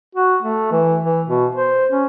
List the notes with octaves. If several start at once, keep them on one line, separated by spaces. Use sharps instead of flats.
F#4
A3
E3
E3
B2
C5
C#4